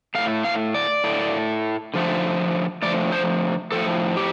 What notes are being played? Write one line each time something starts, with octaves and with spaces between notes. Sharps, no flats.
A2 A3 F5
F5
D5
A2 A3
D3 F3 A3
D3 F3 A3 D5
C5
A2 F3 A3 A4
G4